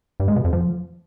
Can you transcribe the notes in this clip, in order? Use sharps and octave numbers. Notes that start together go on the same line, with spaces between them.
G2
G#3
B2
F2
F3